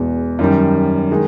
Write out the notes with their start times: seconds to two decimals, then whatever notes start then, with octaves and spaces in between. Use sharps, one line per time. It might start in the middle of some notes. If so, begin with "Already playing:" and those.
Already playing: E2 B2 G#3
0.39 F#2 D#3 G3
1.11 D#3 G#3